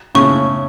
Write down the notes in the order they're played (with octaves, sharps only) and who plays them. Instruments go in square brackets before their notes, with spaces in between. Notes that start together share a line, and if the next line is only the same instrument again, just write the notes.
[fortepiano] A2 C#3 [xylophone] C#6